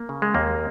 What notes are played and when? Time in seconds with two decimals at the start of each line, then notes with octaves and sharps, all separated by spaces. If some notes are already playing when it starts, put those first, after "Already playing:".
Already playing: A#3
0.09 C#3
0.22 G#3
0.34 D#2 A#3